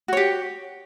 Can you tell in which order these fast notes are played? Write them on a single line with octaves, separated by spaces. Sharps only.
F#4 C#5 G4